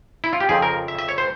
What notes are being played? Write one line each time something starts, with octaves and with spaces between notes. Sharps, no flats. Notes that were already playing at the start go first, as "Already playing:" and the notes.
E4
F4
G4
F2 C#3 F3 C4 G#4
A#4
E5
E5
C#5
C5